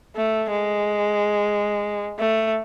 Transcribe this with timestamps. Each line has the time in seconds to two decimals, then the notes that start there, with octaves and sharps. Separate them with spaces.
0.16 A3
0.51 G#3
2.19 A3